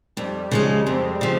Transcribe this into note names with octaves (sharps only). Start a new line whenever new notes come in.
F2 G3
C#3 F3 G#3
F2 G#3 C4
C#3 F3